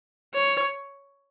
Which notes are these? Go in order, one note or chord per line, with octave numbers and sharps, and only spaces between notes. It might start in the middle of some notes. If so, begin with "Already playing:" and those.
C#5